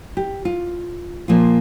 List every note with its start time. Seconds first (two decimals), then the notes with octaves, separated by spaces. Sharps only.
0.17 G4
0.45 F4
1.28 A#2 F3 A#3 F4